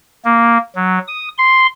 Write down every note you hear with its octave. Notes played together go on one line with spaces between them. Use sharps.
A#3
F#3
D#6
C6